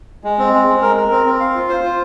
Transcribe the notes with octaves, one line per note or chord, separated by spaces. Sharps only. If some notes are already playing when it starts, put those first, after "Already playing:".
G#3
C4
G#3
G#3
A#4
A#4
C4
C4
F5
F4
C5
F4